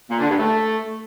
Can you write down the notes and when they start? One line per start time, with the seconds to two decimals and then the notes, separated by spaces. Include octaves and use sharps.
0.10 A#2
0.20 D3
0.30 G2
0.39 A3